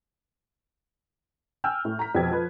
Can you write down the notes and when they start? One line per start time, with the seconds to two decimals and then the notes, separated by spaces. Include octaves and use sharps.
1.64 G5 G#5 E6 F6 G6
1.85 A2
1.99 A#5 B6
2.15 F2 B2 G4 G#6
2.31 F3 B4